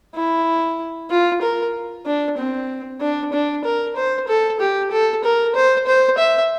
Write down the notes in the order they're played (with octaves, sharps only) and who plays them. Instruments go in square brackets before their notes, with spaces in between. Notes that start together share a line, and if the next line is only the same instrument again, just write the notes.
[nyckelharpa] E4
F4
A#4
D4
C4
D4
D4
A#4
C5
A4
G4
A4
A#4
C5
C5
E5